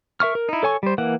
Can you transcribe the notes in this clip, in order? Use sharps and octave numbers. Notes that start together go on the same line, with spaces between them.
A#4 E5 C#6 F6
A#4
D#4 E4
A4 C#5 G#5 C#6
G3 C5
E3 A#3 F#5